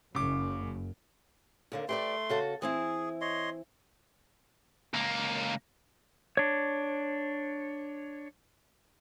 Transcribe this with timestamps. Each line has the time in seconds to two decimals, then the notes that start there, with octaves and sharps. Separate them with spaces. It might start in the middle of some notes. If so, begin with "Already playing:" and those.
0.15 F#1 F#2 C#3 D6
1.72 D#2 D3 A#3
1.89 A3 G4 B4 D5 C6
2.29 C#3 F#4 A4
2.62 E3 C4 E4 G#4
3.21 C#5 D#5 C6
4.94 C#2 A#3
6.37 D4 C#5